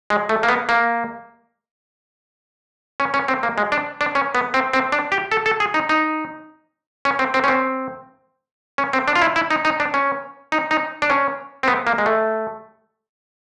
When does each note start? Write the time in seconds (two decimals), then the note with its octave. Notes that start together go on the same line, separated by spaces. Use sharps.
0.10 G#3
0.29 A3
0.43 A#3
0.49 B3
0.69 A#3
3.00 C#4
3.14 C#4
3.28 C4
3.43 A#3
3.58 G#3
3.72 D4
4.01 D4
4.15 C#4
4.35 B3
4.54 C4
4.73 C4
4.92 D4
5.12 G4
5.32 A4
5.46 A4
5.60 G#4
5.74 D#4
5.89 D#4
7.05 C#4
7.19 C4
7.34 C4
7.44 C#4
7.48 C4
8.78 C#4
8.93 C4
9.08 D4
9.16 F4
9.22 E4
9.36 E4
9.51 D#4
9.65 D#4
9.80 D4
9.94 C#4
10.52 D#4
10.71 D#4
11.02 D4
11.10 C#4
11.63 C4
11.68 B3
11.87 A#3
11.98 G#3
12.06 A3